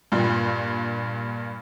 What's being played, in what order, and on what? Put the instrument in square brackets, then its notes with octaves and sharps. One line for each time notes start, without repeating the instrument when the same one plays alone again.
[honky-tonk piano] G2 A#2